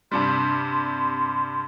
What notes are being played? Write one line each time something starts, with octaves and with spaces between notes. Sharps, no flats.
G2 C3 G3 C6